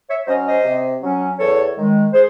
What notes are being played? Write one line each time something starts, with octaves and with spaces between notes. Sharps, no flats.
C#5 E5
F#3 C#4 C5 D#5
C5 D#5
C3
F#3 C#4
E2 A4 C#5
D#3 G#3
G#4 C5